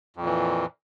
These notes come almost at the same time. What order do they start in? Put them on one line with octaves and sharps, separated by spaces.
F2 A#2 E3